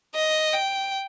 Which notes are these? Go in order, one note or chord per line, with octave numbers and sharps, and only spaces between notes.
D#5
G5